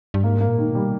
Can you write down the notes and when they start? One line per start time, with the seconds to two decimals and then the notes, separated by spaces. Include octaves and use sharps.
0.14 G2
0.24 G#2 A#3
0.41 A#3
0.47 A#2
0.58 D#3
0.69 B2
0.75 G3